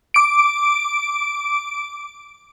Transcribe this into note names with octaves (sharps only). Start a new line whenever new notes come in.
D6 D7